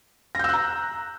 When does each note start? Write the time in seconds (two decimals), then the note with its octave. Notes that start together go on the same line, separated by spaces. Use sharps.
0.35 A#6
0.39 G6
0.44 E6
0.49 F#6
0.54 A#5